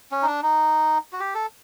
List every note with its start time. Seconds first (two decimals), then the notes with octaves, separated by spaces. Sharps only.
0.12 C#4
0.22 D#4
0.27 D4
0.43 D#4
1.13 F#4
1.20 G4
1.34 A4